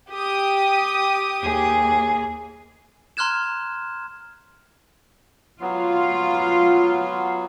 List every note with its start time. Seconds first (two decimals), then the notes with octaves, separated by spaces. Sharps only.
0.10 G4 D#6
1.42 D#2 G#4
3.17 A#5 C6 F6 F#6 G#6 E7
5.61 F#3 B3 F4